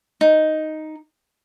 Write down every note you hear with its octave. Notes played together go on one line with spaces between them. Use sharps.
D#4